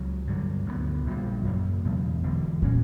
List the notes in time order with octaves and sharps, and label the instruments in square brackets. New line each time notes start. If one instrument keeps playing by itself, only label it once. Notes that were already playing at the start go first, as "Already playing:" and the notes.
Already playing: [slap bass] C#2 C#3 F#3
G2 D3 F#3
D2 D3 G3 B3
A#1 A#2 G3
F#2 C#3 F#3 A#3
E2 B2 F#3
E1 E2 D3
[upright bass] A#2 [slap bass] F#3 C#4